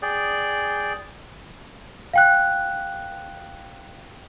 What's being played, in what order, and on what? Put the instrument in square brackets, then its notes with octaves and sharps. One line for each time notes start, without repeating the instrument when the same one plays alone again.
[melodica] G#4 D5 G5
[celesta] F5 G5 F#6